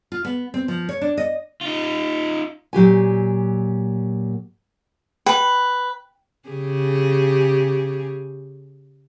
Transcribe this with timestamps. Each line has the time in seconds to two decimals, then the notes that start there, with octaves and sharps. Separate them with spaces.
0.12 F4
0.25 B3
0.54 C4
0.68 F3
0.89 C#5
1.01 D4
1.18 D#5
1.61 D#4 F4
2.73 A#2 F#3 G4 G#5
5.26 B4 G5
6.49 C#3 G4 G#4